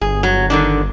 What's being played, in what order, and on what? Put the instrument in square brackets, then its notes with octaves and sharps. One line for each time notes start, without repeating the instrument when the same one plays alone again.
[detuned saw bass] G1 [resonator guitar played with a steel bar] G#4
[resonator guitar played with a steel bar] F#3
D3 D#3 D4